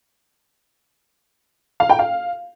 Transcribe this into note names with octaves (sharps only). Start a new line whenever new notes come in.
F5
G5
F5